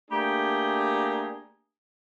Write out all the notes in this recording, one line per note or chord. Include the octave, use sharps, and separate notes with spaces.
A3 A#3 D4 G4 G#4 A#5